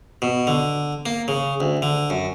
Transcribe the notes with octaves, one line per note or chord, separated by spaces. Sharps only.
B2
D3
A#3
C#3
D2
D3
F#2